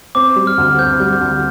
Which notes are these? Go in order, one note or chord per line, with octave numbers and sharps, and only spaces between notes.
C4 D6
G3
F6
D2
C4 G6
G3
D2